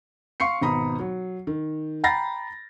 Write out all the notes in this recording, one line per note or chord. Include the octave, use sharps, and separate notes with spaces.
F5 C6 C#6 C7 C#7
G#1 B2 A#5 B5 D#6
F#3
D#3
G5 A#5 B5 A6 A#6 C7